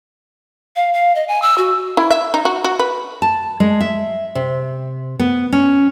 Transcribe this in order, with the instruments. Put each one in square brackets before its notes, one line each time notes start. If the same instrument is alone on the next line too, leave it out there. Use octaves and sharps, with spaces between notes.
[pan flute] F5
F5
D#5
G#5
E6
F#4
[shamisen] E4
E5
D#4
F#4
F#4
B4
[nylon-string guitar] A5
G#3
E5
C3
B3
C#4